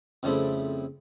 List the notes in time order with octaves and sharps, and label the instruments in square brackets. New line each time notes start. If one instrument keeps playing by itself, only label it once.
[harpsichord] F2 C#3 G3 A3 C4 E4